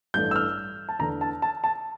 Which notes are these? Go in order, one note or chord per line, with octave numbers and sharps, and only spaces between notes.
A1 G2 E3 A3 D4 G6
E6
F6
A5
E2 D3 A3 D4 A#5
A5
A5
A5